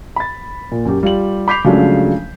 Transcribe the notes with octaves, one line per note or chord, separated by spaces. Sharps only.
B5 A6
A#2
F#2 G4
G3 F4 G4 F#7
B5 D6 G6 B6 C7 F7
C#3 F3 F#3 G#3 A3 D4